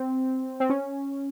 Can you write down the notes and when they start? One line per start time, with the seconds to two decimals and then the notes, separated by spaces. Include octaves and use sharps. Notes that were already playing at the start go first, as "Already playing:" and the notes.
Already playing: C4
0.60 C4
0.70 C#4